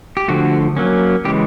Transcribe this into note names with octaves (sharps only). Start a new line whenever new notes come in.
G4
D3 F3 A3 F#4
F#3 A#3 C#4
C#3 E3 G#3 G4